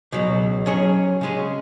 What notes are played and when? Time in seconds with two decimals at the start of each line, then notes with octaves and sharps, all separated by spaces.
0.12 C#2 B2 F#3
0.66 F#3 C#4 G#4 C#5
1.21 C#3 G#3 C#4 G#4